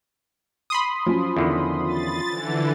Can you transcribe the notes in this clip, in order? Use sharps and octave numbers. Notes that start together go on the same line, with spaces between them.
B5 C6 D#6
F3 F#3 C#4
E2 D3 D#3
A6
D3 E3